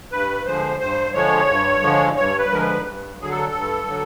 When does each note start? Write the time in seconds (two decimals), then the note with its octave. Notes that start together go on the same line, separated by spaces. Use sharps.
0.11 G2 B4
0.45 D3 F3 G#3 C5
0.80 G2 C5
1.14 D3 F3 G#3 C#5
1.48 G2
1.82 D3 F3 G#3
2.16 G2 C#5
2.39 B4
2.50 D3 F3 G#3 A#4
2.61 B4
2.85 G2
3.19 D3 F#3 G#4
3.30 A4
3.53 G2
3.86 D3 F#3